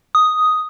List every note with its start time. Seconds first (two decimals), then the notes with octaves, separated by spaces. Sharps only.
0.15 D#6